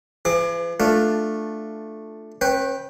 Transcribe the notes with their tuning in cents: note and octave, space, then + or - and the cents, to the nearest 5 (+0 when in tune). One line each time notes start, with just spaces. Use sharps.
E3 +45 G#4 -5 D6 +30
A3 +0 D4 +5 F4 +0
C#4 -35 B4 +0 G5 +0